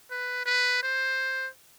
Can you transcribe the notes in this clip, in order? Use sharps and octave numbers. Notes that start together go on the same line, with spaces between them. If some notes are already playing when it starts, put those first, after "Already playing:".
B4
B4
C5